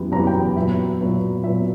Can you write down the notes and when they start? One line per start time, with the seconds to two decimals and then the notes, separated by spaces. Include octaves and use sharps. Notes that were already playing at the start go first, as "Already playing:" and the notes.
Already playing: F#2 E3 G3 B3
0.12 F#2 E3 G3 B3 A#5
0.27 G5
0.56 A#2 F#3 B3 E5
1.00 A#2 F#3 B3
1.44 A#2 F#3 B3 E5